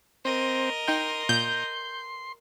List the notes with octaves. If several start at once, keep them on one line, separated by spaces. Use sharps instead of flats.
C4 A#4 C5 D#5
D#4 G5 C6 G6
A#2 G6